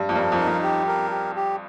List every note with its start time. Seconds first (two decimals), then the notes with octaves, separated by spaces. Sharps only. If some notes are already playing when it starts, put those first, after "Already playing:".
Already playing: G2
0.09 F2
0.15 G2 A#4
0.32 F2
0.39 D#4
0.47 F2
0.63 G4
0.87 A#4
1.11 G4
1.36 G4